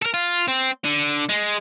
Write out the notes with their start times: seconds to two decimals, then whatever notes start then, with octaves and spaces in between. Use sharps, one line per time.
0.02 A4 A#4
0.14 F4
0.48 C4
0.84 D3
1.29 G#3